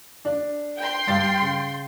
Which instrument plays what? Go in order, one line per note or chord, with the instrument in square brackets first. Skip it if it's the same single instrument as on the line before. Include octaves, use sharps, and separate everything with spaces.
[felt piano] D4
[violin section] G5 C6
[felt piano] G2 A6
C#3